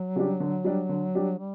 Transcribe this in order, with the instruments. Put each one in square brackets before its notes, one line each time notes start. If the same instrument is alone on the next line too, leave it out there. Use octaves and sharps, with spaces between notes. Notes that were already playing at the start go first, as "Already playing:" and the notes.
Already playing: [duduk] F#3
[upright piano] C#3 G3 D4 G4
D3
G3 D4 G4
D3
G3 D4 G4
[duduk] G3